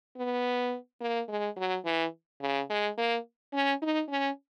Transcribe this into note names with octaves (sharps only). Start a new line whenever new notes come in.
B3
A#3
G#3
F#3
E3
C#3
G#3
A#3
C#4
D#4
C#4